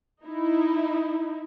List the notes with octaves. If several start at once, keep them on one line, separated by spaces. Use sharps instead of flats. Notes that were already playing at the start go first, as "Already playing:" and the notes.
D#4 E4